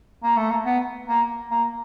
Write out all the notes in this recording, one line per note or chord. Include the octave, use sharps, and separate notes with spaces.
A#3
A3
A#3
B3
A#3
A#3